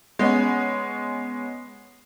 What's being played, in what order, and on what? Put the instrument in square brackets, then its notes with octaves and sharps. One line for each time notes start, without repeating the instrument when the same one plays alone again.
[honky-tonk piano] G#3 B3 C#4